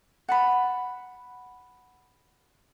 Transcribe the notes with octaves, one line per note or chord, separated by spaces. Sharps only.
F#5 A5 B5